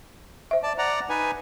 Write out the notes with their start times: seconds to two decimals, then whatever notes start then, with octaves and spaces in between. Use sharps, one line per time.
0.51 C5 E5
0.63 D5 A5
0.78 D5 F#5 A#5
1.09 D#4 B4 G#5